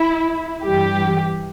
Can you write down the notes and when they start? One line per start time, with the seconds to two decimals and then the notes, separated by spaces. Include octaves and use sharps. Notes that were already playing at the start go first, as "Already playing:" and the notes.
Already playing: E4
0.63 G2 E3 G3 G4